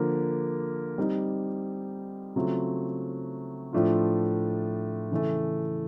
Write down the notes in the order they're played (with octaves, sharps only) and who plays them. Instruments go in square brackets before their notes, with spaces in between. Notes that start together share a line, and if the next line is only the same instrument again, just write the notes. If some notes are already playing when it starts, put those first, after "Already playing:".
Already playing: [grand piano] D3 F3 A#3
G3 C4 D#4
C#3 F#3 A3 C4 F4
A2 F3 A3 D4 F4
C#3 E3 A3